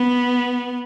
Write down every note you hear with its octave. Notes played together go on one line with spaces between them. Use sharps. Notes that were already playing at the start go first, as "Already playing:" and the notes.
Already playing: B3